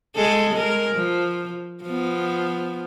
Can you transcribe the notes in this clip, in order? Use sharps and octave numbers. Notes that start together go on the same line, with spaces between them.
G#3 G#4 A4
G#3 A#4
F3
F3 B3